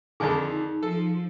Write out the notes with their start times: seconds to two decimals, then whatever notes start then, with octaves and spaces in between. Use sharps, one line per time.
0.20 F2 D3 D#3 G#4 G#5 A5
0.52 D#4
0.83 F3 A4